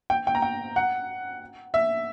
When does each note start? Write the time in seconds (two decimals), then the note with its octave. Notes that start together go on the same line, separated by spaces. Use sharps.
0.10 G5
0.27 G5
0.35 A#5
0.42 G5
0.76 F#5
1.74 E5